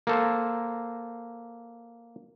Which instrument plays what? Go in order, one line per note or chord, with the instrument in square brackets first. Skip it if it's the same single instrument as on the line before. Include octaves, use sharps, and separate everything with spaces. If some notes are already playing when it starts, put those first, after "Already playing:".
[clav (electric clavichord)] A#3 A4 C5